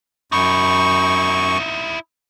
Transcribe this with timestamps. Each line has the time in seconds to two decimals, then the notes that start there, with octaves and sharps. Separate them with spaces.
0.32 F#2 D#4 E4 C#6